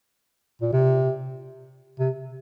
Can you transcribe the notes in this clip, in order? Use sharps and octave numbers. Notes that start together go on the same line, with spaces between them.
A#2
C3
C3